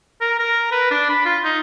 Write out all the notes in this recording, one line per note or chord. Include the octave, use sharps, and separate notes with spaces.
A#4
A#4
B4
D4
B5
F4
D#4